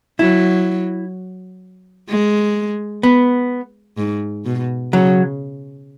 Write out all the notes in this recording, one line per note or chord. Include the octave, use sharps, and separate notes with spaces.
F#3 E4
G#3
B3
G#2
B2
C#3 F#3